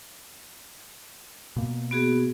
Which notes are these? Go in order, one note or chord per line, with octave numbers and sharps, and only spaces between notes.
B2 A#3
B3 F#4 G#4